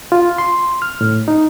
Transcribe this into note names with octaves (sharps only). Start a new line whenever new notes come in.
F4
C6
F6
A2
D#4